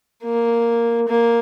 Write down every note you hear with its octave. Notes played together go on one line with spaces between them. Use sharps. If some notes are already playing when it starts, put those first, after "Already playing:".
A#3
A#3